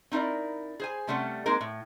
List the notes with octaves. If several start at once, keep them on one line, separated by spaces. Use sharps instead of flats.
C4 D#4 E4 A#4 D5
G#4 C5 G#5
C3 G3 A3 C#4 A4 F#5
G#3 A#3 C4 D#4 A#4
A2